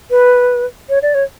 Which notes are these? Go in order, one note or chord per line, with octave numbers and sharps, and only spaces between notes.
B4
C#5
D5
C#5